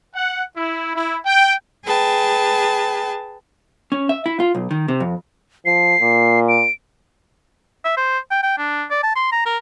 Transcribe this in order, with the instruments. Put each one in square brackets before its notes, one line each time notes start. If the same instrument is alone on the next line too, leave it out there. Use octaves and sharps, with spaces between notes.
[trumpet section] F#5
E4
E4
G5
[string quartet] G#4 B4 G5 A5
[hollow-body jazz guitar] C#4
E5
E4
F4
B1
D#3
C3
F2
[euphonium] F3 [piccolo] C7
[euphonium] A#2
[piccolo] D7
[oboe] E5
C5
G5
G5
D4
D5
A5
C6
A#5
A#4